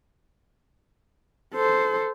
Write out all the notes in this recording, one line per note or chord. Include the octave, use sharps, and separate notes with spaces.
A4 C5